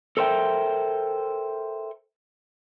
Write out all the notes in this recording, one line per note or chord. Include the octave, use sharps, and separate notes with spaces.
A4 A#4 C5 E5 G5